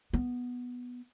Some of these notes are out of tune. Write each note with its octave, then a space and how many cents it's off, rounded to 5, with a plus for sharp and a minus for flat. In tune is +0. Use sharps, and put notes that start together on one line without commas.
B3 -5